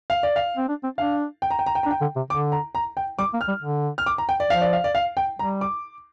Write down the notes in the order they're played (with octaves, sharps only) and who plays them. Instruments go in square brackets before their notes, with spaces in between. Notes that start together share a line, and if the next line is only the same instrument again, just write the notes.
[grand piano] F5
D5
F5
[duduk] C4
D4
C4
[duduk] D4 [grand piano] F5
[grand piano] G5
A#5
G5
A#5
G5
[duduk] D4 [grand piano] A#5
[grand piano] G5
[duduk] D3
C3
[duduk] D3 [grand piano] D6
[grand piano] A#5
A#5
G5
[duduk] G3 [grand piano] D6
[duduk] A#3
[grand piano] F6
[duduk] G3
D3
[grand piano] F6
D6
A#5
G5
D5
[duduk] F3 [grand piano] F5
[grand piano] D5
F5
D5
F5
G5
[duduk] G3 [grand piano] A#5
[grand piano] D6